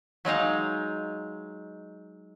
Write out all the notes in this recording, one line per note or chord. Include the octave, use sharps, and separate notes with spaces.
F#3 G#3 D#4 F5